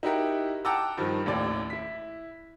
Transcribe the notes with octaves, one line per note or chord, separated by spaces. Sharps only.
D#4 E4 F#4 G4 A#4
F#5 G5 A5 A#5 D6 E6
G2 D#3 F3
A1 D#2 A2 D5
E4 B6